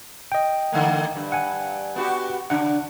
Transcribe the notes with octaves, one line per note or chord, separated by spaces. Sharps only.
D#5 G5
D3 A3 A#3
G2
F#5 G#5
B3 F#4 G4
C#3 D4 F#5